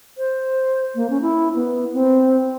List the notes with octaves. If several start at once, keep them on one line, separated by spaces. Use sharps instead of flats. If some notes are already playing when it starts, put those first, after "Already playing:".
C5
A#3
C#4
E4
B3
C4